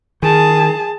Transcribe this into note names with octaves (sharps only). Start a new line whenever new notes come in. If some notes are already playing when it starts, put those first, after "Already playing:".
D#3 G#4 A5